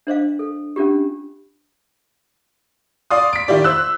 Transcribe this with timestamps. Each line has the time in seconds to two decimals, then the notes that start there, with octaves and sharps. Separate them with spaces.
0.07 D4 C5 D#5 F5
0.39 A4
0.76 C#4 D4 F4 G4
3.11 D5 F5 C6 D#6
3.33 B6 D7
3.48 D#3 E4 F4 G4 D5
3.64 C5 E6 F#6